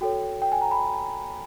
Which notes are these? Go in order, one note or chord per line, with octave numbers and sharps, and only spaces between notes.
F#4 A4 C#5 G5
G5
G#5
A#5
B5